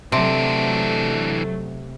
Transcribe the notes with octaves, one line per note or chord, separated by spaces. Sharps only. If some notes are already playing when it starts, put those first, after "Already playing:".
C3 E3 F#3 A3 D4